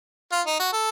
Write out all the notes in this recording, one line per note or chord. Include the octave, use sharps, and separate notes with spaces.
F4
D#4
F#4
A4